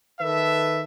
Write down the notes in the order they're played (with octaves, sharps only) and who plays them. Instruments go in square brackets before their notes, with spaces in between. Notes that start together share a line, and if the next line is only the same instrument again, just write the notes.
[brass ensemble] D#3 A4 B4 E5